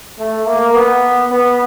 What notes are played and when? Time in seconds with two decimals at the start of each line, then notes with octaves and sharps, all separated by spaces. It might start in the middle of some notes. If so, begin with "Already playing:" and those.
0.19 A3
0.47 A#3
0.75 B3
1.31 B3